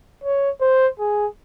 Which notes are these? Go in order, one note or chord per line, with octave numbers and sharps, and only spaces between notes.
C#5
C5
G#4